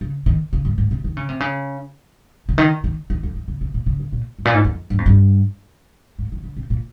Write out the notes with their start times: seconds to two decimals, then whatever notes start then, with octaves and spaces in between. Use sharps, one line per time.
0.01 C#3
0.26 D#3
0.53 C#3
0.65 G2
0.78 G#2
0.91 C3
1.04 D#3
1.17 C#3
1.29 C3
1.40 C#3
2.49 C#3
2.58 D#3
2.84 D#3
3.10 D#3
3.23 F2
3.35 D#3
3.48 C#3
3.61 C3
3.74 A#2
3.86 C#3
4.00 C#3
4.12 A#2
4.39 G#2
4.45 A#2
4.54 G#2
4.65 F2
4.90 G2
4.98 F2
5.06 G2
6.19 G#2
6.32 D#3
6.44 C#3
6.56 C3
6.70 A#2